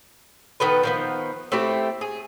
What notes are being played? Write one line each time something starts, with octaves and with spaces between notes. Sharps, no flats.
D#3 B3 A4 B4
D#3 F3 B3
A3 C4 E4 G4
G#4